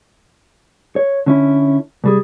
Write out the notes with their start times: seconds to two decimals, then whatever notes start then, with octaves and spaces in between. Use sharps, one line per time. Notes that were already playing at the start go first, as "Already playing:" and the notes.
0.96 C#5
1.26 D3 C#4 E4
2.04 C2 G3 G#4